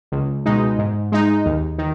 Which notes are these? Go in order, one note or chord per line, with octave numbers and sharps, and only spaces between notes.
C#2
B2 G#3 D#4
G#2
G#3 D#4
D#2
D#3